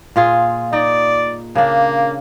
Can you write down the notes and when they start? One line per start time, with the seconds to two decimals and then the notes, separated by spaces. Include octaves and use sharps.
0.16 A#2 F4 G#4
0.73 D#4 D5
1.55 C#3 A#3 D4